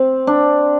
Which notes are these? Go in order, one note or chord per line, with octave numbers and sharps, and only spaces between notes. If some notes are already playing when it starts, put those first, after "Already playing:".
Already playing: C4
D4